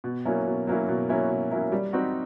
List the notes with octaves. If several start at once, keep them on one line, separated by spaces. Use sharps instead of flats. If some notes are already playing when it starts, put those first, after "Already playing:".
B2
F#3 A#3 C#4 E4
B2
F#3 A#3 C#4 E4
B2
F#3 A#3 C#4 E4
B2
F#3 A#3 C#4 E4
G3
C4 D#4 F#4